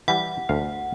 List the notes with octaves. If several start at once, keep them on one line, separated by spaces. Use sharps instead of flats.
E3 G3 F#5
D2 F5